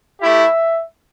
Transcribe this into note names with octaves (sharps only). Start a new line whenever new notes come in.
A3 E4 G4 E5